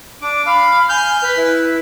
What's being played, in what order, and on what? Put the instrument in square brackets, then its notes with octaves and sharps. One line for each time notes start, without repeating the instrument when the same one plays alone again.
[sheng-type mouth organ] D4 D6
[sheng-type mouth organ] F5 [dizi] B5
[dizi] G#5 [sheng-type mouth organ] F6 G6
[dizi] B4
[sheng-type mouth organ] E4